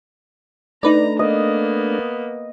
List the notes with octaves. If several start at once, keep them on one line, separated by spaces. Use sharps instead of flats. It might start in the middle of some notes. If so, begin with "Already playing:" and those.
A3 D4 D#4 B4 D5 A#5
A#3 B3 D#5